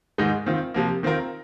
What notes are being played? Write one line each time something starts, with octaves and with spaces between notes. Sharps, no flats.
G#2 D#3 G#3 D#4
D#3 C4 F4
C3 F3 A#3
D#3 C4 F4 A#4